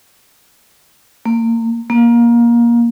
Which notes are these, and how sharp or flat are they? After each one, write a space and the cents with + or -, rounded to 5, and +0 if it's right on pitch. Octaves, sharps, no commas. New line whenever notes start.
A#3 -30
A#3 +20